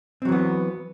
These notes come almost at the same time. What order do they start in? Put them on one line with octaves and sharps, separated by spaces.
C4 F#3 E3 B3